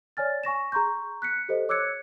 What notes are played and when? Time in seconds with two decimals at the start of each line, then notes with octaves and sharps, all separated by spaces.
0.17 C#5 D5 G#5 F6 A6
0.44 G#5 C#6 A#6 E7
0.72 G#4 A#5 C6 C#6 G6
1.22 F#6 B6 C#7
1.49 G4 A4 C5 D#5
1.69 C#5 D6 E6 F#6 G#6 C#7